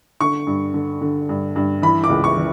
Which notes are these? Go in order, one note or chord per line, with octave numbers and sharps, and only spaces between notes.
D3 C#6
G2
D3
D3
G2
G2
E3 B5
D6
C#2
C#6
E3